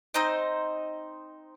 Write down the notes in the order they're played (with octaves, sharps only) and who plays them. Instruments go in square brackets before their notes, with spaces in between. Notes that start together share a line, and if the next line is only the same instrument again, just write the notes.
[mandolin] C4 D#4 C5 D#5